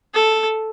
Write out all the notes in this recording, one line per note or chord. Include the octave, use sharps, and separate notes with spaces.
A4